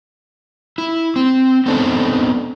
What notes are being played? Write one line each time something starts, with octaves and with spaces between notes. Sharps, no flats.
E4
C4
B3 C4 D4 D#4 A4